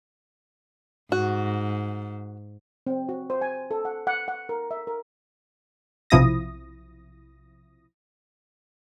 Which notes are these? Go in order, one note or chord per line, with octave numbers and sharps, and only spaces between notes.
G#2 F#4
C4
F#4
C5
G#5
A4
F#5
F#5
F#5
A#4
E5
A#4
B1 C3 F3 E4 D#6 A#6